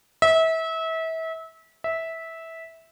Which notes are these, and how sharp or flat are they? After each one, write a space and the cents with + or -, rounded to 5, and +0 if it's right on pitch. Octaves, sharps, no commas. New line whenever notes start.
E5 -30
E5 -15